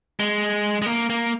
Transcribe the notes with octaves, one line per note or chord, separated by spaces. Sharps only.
G#3
G#3
A#3
A#3